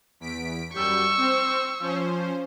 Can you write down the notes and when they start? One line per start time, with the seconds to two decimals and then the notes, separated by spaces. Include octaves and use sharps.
0.20 E2 B6 D7
0.74 F#2 G3 C#6 E6 G6
1.17 C4 C5
1.80 F3 C#4 C5